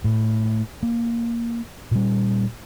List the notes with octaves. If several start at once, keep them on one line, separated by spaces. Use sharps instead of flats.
A2
A#3
A#2 G3